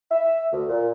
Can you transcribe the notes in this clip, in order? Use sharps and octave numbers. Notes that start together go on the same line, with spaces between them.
E5
D2
A#2